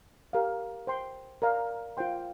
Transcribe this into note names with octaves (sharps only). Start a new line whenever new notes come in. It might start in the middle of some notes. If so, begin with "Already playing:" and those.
G4 A#4 F5
C5 G5 C6
A#4 D5 F5 A#5
F4 C5 G5 C6